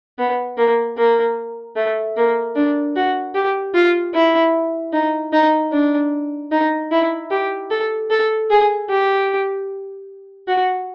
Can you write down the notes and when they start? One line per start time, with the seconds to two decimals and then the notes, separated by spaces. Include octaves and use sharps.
0.19 B3
0.58 A#3
0.98 A#3
1.76 A3
2.17 A#3
2.56 D4
2.96 F#4
3.35 G4
3.75 F4
4.14 E4
4.93 D#4
5.33 D#4
5.72 D4
6.52 D#4
6.92 E4
7.31 G4
7.71 A4
8.10 A4
8.50 G#4
8.89 G4
10.48 F#4